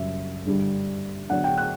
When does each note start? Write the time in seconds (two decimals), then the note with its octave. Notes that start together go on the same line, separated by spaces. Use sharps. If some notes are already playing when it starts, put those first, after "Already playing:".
Already playing: F#2 C#3 G3 E5
0.45 G2 D3 G3
1.29 D3 F#3 B3 D4 F#5
1.44 G5
1.58 F#6